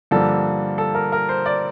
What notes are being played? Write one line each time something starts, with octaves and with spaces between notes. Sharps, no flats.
G2 D3 F3 A#3 A4
A4
A#4
A#4
C5
D5